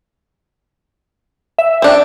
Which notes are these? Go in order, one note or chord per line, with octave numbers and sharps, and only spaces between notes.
E5
C4 D4